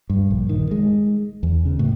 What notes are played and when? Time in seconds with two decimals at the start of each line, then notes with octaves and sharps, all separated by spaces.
0.10 G2
0.30 A#1
0.49 D#3
0.71 G#3
1.43 E2
1.65 C#3
1.79 A2